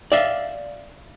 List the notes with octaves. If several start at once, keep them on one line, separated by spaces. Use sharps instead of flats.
D5 E5 F5